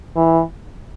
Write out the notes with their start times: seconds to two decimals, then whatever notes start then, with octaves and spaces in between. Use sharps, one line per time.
0.16 E3